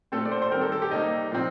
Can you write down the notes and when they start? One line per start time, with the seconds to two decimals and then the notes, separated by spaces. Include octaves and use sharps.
0.12 A#2 A3 C4 A4
0.25 D5
0.32 C5
0.42 C5
0.51 D#3 G3 C4 A#4
0.61 A4
0.72 A4
0.82 G4
0.91 C3 G3 A#3 D#4
1.32 A#2 F3 C4